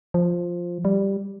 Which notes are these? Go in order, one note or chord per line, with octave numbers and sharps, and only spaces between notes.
F3
G3